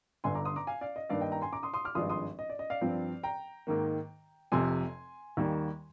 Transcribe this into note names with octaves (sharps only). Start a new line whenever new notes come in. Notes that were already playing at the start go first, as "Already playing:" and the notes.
G1 G2 D3 G#5 C6
A#5 D6
C6 D#6
A#5 D6
F5 G#5
D5 F5
D#5
G2 D#3 A#3 D4 D5 F5
D#5 G5
G5 A#5
G#5 C6
A#5 D6
C6 D#6
C6 D#6
D6 F6
G#1 G2 F3 G#3 D4 C6 D#6
C6 D#6
D#5
D5
D#5
D5 F5
G2 F3 C4
G5 A#5
G#2 D#3 A#3
F1 F2 C3 G#5 C6
D#2 D#3 G3 A#3